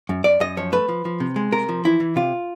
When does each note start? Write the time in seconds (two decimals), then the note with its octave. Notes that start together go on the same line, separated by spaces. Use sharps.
0.09 F#2
0.24 F#2 D5
0.40 F#2 D#5
0.57 F3 C#5
0.72 A3 B4
0.89 F3
1.05 F3
1.20 C3
1.36 G#3
1.52 C3 A#4
1.69 F3
1.85 E3 E4
2.00 E3
2.16 C3 F4